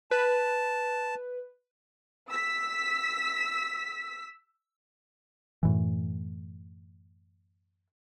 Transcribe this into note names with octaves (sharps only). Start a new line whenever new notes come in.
B4 A5
E6 B6
F#2 A2 E3